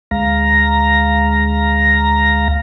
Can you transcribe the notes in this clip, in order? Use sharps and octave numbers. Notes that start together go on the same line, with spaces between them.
D2 G#3 F5 A#5 A#6